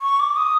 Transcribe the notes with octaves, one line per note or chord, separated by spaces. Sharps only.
C#6
D6
D#6